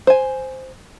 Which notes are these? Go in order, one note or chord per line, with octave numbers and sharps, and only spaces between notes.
C5 G#5